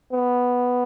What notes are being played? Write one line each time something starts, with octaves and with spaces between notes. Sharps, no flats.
B3